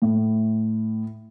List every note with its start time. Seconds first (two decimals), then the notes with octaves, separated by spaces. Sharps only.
0.02 A2